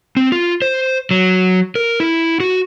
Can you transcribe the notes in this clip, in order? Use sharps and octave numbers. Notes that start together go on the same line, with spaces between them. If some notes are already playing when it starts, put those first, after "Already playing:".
C4
F4
C5
F#3
A#4
E4
F#4